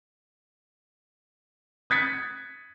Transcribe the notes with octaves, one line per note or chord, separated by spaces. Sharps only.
D#6 F#6 G#6 A6 B6 C#7